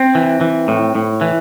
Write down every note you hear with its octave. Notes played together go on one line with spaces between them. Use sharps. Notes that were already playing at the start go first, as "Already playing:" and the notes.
Already playing: C4
E3
E3
A2
A2
E3